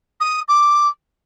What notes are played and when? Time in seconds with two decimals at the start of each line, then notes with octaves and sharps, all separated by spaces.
0.20 D#6
0.48 D6